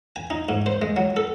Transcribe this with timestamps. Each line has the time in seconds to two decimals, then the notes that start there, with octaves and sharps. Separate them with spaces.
0.16 G#5
0.30 D#4
0.49 G#2
0.66 C5
0.82 G#3
0.96 F#3
1.17 A4